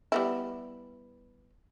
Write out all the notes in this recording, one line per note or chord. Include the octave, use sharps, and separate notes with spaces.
G3 B3 E4